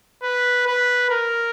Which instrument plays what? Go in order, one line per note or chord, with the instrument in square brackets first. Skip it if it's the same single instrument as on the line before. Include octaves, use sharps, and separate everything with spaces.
[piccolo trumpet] B4
B4
A#4